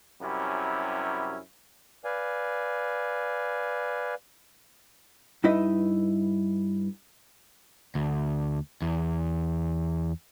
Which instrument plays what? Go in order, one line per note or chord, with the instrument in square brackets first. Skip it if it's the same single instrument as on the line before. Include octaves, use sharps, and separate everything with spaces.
[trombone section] F#2 C3 G3 C#4 E4
[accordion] B4 D5 F5 G#5
[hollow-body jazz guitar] G2 D#4 E4 B4 D#5
[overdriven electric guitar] D2
E2